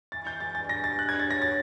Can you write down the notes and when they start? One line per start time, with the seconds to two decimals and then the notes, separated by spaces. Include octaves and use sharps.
0.12 E3 A6
0.27 E3 G6
0.40 G#3 A6
0.55 G2 A6
0.69 G2 A#6
0.84 G#3 A6
0.99 D3 F#6
1.09 G#6
1.13 D4
1.19 A6
1.27 F#3 A#6
1.41 D4 A6